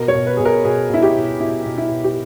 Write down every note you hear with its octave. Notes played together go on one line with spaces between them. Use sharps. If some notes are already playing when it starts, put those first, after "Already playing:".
Already playing: B2 A#4
C#5
B2
B4
B2 G#4
A#4
B2 G#4
B2 E4
G4
B2
B2 E4
B2
E4
B2
G4